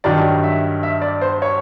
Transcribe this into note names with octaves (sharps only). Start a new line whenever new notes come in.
G2 D#3 F#3 D5
E5
E5
D5
C5
C#5